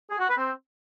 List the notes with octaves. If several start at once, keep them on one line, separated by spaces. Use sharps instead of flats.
G#4
F#4
B4
C4